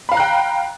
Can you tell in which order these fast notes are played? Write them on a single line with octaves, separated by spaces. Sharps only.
B5 F5 A#5 F#6 G5